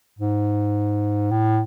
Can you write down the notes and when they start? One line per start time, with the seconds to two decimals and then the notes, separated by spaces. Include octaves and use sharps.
0.19 G#2
1.31 A2